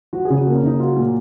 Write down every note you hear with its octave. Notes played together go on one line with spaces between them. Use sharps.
F3 F#4
G#4
C#3
F#4
A#3
C#4
C#3 D#4
F#3 F4
A#2